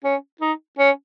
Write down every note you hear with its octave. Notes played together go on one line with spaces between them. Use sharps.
C#4
D#4
C#4